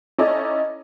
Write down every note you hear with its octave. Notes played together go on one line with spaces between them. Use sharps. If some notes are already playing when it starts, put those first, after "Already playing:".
C#4 D#4 E4 A4 D5 D#5